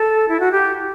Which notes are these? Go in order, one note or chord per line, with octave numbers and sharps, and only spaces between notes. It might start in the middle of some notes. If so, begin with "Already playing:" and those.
Already playing: A4
E4
F#4
G4